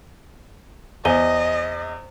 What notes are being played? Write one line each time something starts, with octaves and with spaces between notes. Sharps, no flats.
E2 C5 D#5 G#5 G7